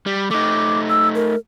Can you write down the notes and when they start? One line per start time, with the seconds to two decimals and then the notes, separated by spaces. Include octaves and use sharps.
0.06 G3
0.31 A3 D#4 D6
0.89 E6
1.15 A#4